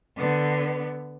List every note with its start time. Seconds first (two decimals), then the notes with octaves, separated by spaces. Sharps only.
0.17 D3 B3